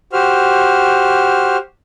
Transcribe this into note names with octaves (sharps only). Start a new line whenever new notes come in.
F#4 G4 C5 F6